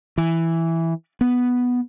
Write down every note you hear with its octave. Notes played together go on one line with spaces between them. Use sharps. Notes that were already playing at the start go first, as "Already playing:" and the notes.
E3
B3